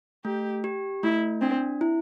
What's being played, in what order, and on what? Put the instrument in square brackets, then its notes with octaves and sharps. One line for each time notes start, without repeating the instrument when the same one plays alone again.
[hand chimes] A3 [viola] G4
[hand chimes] G4
[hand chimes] A3 [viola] E4
[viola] C4 [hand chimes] D4
[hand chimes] E4